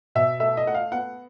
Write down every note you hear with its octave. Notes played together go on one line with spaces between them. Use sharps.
B2 E5
A3 E5
D#5
A3 F#5
F5
B3 F#5